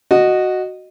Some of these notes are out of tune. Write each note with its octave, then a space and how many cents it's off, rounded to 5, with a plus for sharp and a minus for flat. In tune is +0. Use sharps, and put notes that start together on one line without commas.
F#4 +0 D#5 -10